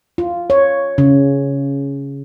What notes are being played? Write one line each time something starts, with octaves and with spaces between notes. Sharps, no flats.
F4
C#5
C#3